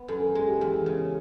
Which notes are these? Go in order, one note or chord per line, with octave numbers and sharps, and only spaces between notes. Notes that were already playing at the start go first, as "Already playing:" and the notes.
Already playing: B3
F#2 A4
A#4
G#3 G#4
G4
E2
C#3